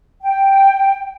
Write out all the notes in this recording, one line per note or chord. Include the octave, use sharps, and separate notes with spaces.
G5